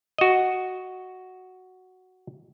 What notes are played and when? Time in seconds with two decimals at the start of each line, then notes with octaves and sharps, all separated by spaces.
0.18 F#4 D#5